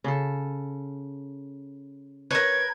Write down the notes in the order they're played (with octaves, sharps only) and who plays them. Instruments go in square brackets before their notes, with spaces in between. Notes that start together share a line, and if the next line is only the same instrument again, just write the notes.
[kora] C#3 A4
[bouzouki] A#4 B4 [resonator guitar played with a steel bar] C#5 [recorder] G#6